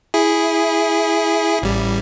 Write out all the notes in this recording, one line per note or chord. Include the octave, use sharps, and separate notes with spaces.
E4 G#4
A1 G3